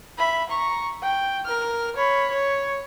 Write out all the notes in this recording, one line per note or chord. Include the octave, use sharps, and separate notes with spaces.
E5 B5
A#5 C#6
G5
A#4 F6
C#5 B5
C#5